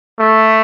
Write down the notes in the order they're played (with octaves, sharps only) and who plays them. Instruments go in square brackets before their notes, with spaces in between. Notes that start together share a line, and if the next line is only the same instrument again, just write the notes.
[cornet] A3